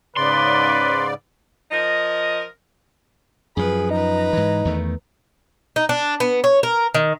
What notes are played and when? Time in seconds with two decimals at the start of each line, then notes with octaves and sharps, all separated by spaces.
0.17 G#2 C#3 B4 D5 C6
1.71 F3 A#4 D#5
3.57 F#2 F3 G#4 B4 B5
3.91 D#4 B4 A#5
4.33 G#2 E3
4.65 E2 D#3 A3
5.76 D#4
5.89 D4
6.20 B3
6.44 C#5
6.63 A#4
6.94 D#3